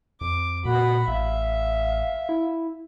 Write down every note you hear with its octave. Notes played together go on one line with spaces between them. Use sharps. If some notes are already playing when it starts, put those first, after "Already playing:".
F2 D6
A#2 F#4 F#5 B5
A1 E5 F5
E4